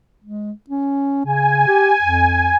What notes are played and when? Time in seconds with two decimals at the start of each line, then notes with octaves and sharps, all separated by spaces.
0.24 G#3
0.69 C#4
1.25 C#3 G#5
1.67 G4
2.01 F2